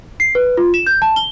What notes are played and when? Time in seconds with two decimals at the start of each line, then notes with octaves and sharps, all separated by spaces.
0.20 C7
0.35 B4
0.57 F4
0.74 E7
0.86 G6
1.02 A5
1.16 G7